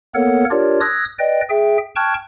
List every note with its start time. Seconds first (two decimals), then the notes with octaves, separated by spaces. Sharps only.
0.15 A#3 B3 A4 A#4 C#5 F#5
0.51 D4 F4 G4 A#4 C#5 D5
0.81 D#6 E6 F#6 G#6 A#6
1.19 B4 D5 D#5 G5
1.50 G#4 E5 G5
1.96 G5 A5 C#6 F6 F#6 G#6